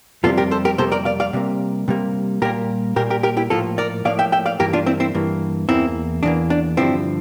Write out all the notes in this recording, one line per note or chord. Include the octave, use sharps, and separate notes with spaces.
F2 C3 G3 A#3 F4 A4
G4 A#4
A4 C5
G4 A#4
F2 C3 G3 A#3 A4 C5
A#4 D5
D5 F5
D5 F5
C3 G3 A#3
C3 G3 A#3
A#2 G3 A#3 G4 A#4
A#2 G3 A#3 G4 A#4
G4 A#4
G4 A#4
E4 G4
A2 F3 A#3 F4 A4
A#4 D5
A2 F3 A#3 D5 F5
E5 G5
E5 G5
D5 F5
G2 E3 A#3 G4 A#4
D4 F4
C4 E4
C4 E4
G2 E3 A#3
E2 E3 A#3 C4 E4
E2 E3 A#3 D4
D4
G2 D3 F3 C4 E4